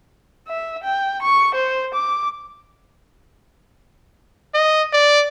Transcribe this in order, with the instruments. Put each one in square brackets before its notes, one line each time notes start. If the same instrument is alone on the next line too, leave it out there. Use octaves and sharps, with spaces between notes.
[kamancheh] E5
G5
C#6
C5
D6
[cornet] D#5
D5